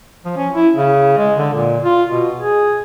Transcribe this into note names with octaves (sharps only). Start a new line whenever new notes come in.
F3
C#4
E4
C#3
G#3
D3
A#2
F4
B2
G#4